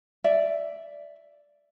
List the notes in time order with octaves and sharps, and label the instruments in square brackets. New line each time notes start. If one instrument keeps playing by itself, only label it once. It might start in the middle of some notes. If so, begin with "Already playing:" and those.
[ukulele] D5 E5